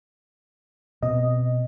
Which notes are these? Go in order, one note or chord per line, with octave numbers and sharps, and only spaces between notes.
B2 B3 C4 D#5